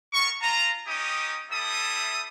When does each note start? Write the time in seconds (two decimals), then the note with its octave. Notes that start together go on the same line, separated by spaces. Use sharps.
0.13 B3 A#4 C#6
0.41 F4 A5 A#5
0.87 C#4 D#4 G4 D#6
1.50 G3 E4 A4 E5 D#6